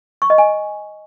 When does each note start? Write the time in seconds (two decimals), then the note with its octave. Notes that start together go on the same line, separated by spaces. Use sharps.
0.22 C#6
0.30 D#5
0.38 G#5